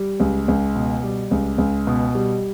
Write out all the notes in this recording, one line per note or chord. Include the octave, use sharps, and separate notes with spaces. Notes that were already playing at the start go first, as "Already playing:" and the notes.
Already playing: G3
C#2
C#2
B2
G3
C#2
C#2
B2
G3